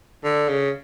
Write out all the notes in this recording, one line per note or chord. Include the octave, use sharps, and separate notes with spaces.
D3
C#3